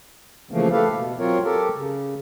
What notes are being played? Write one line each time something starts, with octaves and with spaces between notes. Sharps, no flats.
C#3 E3 F3 A3 A#3
A3 G4 A4 B4 F5
B2
F#3 C4 F4 A#4 C#5
G4 A4 A#4
C#3